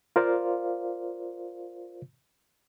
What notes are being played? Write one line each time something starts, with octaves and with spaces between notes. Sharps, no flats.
F4 A#4 C5 D5 F5